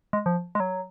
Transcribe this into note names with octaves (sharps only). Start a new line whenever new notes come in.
G#3
F3
G#3
F#3